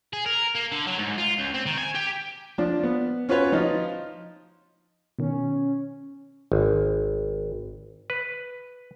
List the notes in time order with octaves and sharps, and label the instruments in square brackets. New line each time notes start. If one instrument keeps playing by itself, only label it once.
[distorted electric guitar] G#4
A#4
A#3
D3
F#3
G#2
F4
C#2
C4
D#3
G#5
G4
[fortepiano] F3 D4
B3
C#4 F4 F#4 B4 C#5
F3 D#4 F4
[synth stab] B2 D#3 [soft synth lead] C#4
[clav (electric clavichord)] G#1
B4